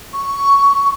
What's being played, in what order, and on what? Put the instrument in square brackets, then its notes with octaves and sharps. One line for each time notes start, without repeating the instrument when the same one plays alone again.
[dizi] C#6